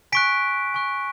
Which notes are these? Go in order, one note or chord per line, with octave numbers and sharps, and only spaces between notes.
G#5 C#6 F#6 B6 D7
G#5 C#6 F#6